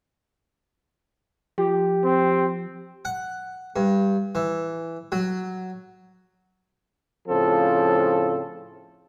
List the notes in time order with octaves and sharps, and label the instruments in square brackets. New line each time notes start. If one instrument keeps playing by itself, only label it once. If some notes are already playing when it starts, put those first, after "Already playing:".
[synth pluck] F3 [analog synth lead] G4
[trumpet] C4
[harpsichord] F#5
G2
E3
F#3
[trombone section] A2 C#3 F3 C4 A4